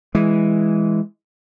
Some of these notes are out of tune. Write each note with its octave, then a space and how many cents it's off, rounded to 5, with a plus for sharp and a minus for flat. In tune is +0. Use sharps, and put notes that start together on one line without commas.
E3 +0 G#3 +0